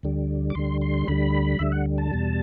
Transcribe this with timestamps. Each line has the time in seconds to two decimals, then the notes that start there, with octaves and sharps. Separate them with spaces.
0.03 D2 D3 G3
0.50 D6
0.55 D2 D3 G3 C6
0.81 C6
1.08 D2 D3 G3 B5
1.59 D2 D3 G3 E5
1.72 F#5
1.98 A5
2.11 E2 B2 G3